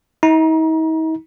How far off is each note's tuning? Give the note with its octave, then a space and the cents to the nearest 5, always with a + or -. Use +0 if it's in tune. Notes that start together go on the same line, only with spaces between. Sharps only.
D#4 +45 A#5 +30